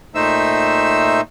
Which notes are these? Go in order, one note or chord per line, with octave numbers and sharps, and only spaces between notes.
A#2 A3 D#4 C5 E5 E6